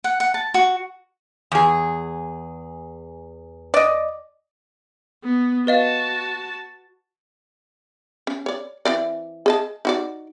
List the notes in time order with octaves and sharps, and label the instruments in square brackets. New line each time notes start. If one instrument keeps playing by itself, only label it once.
[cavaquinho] F#5
F#5
A5
F#4
[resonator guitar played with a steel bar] E2 G#4
[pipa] D5 D#5
[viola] B3
[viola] F#4 A5 [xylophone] B4 D#5 F5
[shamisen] C#4
C#5 D5
E3 C4 D5
G#4 D#5 A5
D#4 F#4 D5